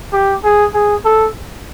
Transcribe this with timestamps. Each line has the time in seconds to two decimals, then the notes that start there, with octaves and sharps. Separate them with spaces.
0.13 G4
0.44 G#4
0.74 G#4
1.05 A4